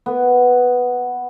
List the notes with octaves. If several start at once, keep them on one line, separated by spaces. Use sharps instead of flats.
B3